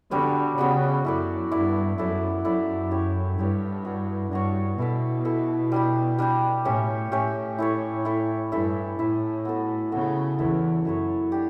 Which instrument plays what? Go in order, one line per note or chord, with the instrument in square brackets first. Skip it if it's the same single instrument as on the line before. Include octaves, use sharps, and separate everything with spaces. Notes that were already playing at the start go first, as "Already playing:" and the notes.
[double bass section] D3 [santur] G3 B3 F#4
[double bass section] C#3 [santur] G3 B3 F#4
[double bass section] F#2 [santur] E4 A4 D5
[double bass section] G2 [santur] E4 A4 D5
[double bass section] F#2 [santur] E4 A4 D5
[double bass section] F#2 [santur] E4 A4 D5
[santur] E4 G4 C#5
[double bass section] G2 [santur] E4 G4 C#5
[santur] D4 F#4 C#5
[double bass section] G2 [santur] D4 F#4 C#5
[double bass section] B2 [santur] E4 A4 E5
[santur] E4 A4 E5
G3 D4 G4
G3 D4 G4
[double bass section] A2 [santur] C#4 G4 C#5 E5
[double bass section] A2 [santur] C#4 G4 C#5 E5
[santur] E4 A4 C#5
E4 A4 C#5
[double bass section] G2 [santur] E4 A4 E5
[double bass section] A2 [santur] E4 A4 E5
[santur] B3 F#4 A4
[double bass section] C#3 [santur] B3 F#4 A4
[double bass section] E2 [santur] E4 A4 C#5
[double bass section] F#2 [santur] E4 A4 C#5
[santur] D4 G4